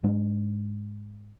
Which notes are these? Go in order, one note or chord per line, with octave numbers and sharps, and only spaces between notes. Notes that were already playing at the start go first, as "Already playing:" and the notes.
G#2 G#3 D4